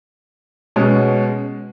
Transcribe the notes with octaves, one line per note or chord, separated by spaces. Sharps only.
B2 G#3 C#4